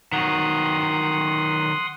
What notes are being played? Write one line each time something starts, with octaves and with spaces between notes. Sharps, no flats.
D#3 F#3 F#5 C6 D#6